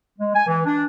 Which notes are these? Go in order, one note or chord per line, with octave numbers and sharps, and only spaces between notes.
G#3
G#5
E3
D4